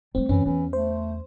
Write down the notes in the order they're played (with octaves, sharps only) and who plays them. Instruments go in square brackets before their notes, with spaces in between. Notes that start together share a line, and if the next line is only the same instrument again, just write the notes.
[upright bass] G3 A3 [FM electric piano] C4
[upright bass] F#2 [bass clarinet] E3 [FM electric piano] C#4
[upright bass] E2 [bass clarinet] E3
[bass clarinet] A3 [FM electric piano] C5